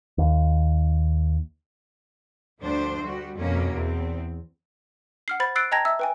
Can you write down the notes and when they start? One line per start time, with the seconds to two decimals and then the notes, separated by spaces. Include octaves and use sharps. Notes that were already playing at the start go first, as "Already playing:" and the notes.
0.18 D#2
2.61 D2 G2 F3 D4 C5
3.04 G3 F#4
3.38 F2 B2 A#3 C#4
3.73 E2 C4
5.28 F#5 F6 C7
5.40 C5 B5 A6
5.56 E6 F#6 A6 C7 D7
5.72 D#5 G5 A5 A#5 G#6 A#6
5.85 E5 E6
5.99 B4 G5 G#5